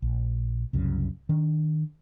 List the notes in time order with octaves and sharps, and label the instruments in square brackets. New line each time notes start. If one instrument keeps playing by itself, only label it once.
[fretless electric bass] A#1
C2 F#2 C#3
D#3 D4